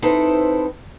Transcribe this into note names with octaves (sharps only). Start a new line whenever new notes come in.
C4 D#4 E4 A4 B4 C5